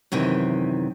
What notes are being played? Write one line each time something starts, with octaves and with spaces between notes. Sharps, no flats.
F#2 C3 D#3 E3